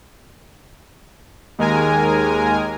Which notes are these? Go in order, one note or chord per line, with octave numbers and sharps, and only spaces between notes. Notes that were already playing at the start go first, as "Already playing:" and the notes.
D#2 G#3 A#4 G#5